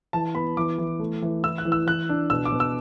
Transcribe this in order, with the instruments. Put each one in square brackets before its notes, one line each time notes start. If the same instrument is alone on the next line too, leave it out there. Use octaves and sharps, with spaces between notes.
[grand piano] E3 A5
B3 B5
E3 D6
E3
A3
E3
E4 E6
F#6
E3
E6
E3 F#6
D4
B2 E6
D6
B2
E6